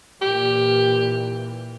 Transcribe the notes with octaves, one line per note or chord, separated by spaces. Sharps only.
A#2 E3 G4